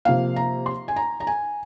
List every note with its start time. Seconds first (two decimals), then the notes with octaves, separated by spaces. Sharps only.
0.05 C3 F3 A#3 F5
0.36 A#5
0.66 C6
0.88 G#5
0.96 A#5
1.20 A#5
1.27 G#5